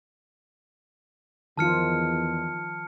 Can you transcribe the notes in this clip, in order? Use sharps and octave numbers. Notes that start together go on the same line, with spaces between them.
E2 D#3 F3 F4 A5 F6 C#7